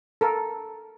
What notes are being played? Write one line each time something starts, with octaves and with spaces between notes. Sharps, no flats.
A4 A#4